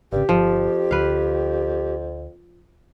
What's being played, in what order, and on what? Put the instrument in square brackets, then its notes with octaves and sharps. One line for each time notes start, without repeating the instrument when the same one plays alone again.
[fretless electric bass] G#1 C#3 [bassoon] G2 [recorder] G4
[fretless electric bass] G1 [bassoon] F2 [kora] F3
[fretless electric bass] D2 [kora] B4 F5